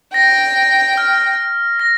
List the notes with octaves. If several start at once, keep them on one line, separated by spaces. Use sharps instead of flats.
G5 A#6
F6
A#6